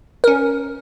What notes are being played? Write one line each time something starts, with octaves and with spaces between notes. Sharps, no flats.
C#4 A#4